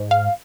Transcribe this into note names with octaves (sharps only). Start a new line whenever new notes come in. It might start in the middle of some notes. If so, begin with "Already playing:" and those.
Already playing: G#2
F5